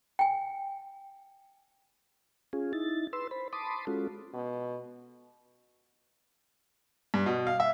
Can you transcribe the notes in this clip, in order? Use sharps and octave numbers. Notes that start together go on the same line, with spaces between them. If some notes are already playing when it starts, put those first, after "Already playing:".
G5 G#5
C#4 F4 G#4
D#4 E4 A6
B4 C6 E6
C5 B5
A5 B5 C6 D6 D#6
G#3 C#4 F4 F#4 A4
B2
G2
B2
F5
E5